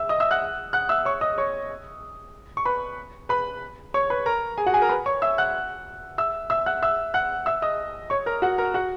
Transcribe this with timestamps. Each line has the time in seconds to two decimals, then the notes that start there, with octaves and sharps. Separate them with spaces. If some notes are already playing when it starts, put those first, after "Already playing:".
Already playing: E5 E6
0.09 D#5 D#6
0.20 E5 E6
0.31 F#5 F#6
0.73 F#5 F#6
0.89 E5 E6
1.05 C#5 C#6
1.21 D#5 D#6
1.38 C#5 C#6
2.57 C#6
2.65 B4 B5
3.29 B4 B5
3.94 C#5 C#6
4.10 B4 B5
4.26 A#4 A#5
4.58 G#4 G#5
4.66 F#4 F#5
4.74 G#4 G#5
4.82 A#4 A#5
4.89 B4 B5
5.06 C#5 C#6
5.22 E5 E6
5.38 F#5 F#6
6.18 E5 E6
6.50 E5 E6
6.66 F#5 F#6
6.82 E5 E6
7.14 F#5 F#6
7.46 E5 E6
7.62 D#5 D#6
8.10 C#5 C#6
8.26 A#4 A#5
8.42 F#4 F#5
8.58 A#4 A#5
8.74 F#4 F#5